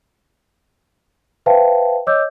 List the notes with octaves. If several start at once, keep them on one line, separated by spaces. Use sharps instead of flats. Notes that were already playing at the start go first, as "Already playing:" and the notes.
B4 C5 E5 F5 G5 A5
C#5 D#5 D6 E6 G6